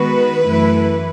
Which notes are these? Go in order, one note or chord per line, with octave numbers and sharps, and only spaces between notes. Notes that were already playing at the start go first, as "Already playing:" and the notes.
Already playing: D#3 G#3 B3 F#4 B4
F#2 E3 A3 E4